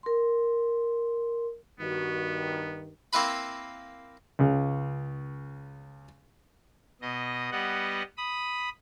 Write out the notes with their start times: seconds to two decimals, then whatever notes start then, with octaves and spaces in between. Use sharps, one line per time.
0.03 A#4 C6
1.80 G2 D#3 B3 F#4
3.13 A#3 C4 E4 B4 B5
4.39 C#2 C#3
7.01 B2 D#5
7.52 G3 B3 D#5 F#5
8.17 B5 D#6